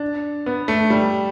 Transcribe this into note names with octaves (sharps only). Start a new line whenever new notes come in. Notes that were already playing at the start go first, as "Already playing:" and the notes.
Already playing: D4
B3
A3
G3